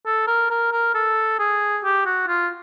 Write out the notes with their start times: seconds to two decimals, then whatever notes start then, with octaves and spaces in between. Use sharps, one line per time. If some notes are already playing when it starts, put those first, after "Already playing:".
0.06 A4
0.27 A#4
0.50 A#4
0.72 A#4
0.95 A4
1.39 G#4
1.84 G4
2.06 F#4
2.28 F4